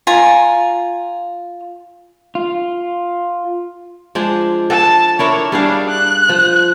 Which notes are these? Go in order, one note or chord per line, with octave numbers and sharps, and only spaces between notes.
F4 G#5 A#5
F4
F3 G#3 D4
A4 A5
D4 E4 A#4 C#5
G3 D4 G#4 F5
F#6
F3